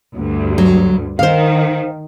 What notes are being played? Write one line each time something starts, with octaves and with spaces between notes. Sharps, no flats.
D2 G2
F#3
D#3 C5 F5